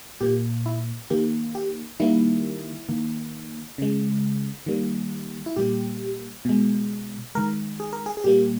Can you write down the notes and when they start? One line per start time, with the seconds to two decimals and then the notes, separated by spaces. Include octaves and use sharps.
0.21 A#2 A#3 G4
0.66 E4
1.10 D#3 A#3 G4
1.55 G4
2.00 D#3 G3 A#3 E4
2.89 D#3 A#3
3.78 C#3 G#3
4.66 D#3 G3 A#3
5.46 E4
5.56 A#2 G3 A#3 G4
6.45 B2 G#3
7.35 D#3 G#3 A#4
7.80 G#4
7.93 A#4
8.06 G#4
8.17 G#4
8.24 A#2 G3 A#3 G4